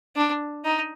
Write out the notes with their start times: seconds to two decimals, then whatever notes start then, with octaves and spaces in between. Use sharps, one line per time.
0.16 D4
0.65 D#4